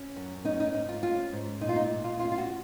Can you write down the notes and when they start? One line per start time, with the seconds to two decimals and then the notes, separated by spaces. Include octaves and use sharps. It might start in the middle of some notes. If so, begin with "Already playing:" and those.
Already playing: C#4
0.16 F#2
0.44 C#4 D#4
0.60 D#4
0.74 G#2 D#4
0.89 F4
1.03 C#4 F4
1.32 G#2
1.61 A#2 D#4
1.69 F4
1.76 D#4
1.90 A#2
2.04 F4
2.19 C#4 F4
2.32 F4
2.38 F#4